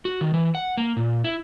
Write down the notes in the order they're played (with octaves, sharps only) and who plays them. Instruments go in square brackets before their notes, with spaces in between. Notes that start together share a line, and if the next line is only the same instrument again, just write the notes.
[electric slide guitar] F#4
D#3
E3
F#5
A#3
A#2
E4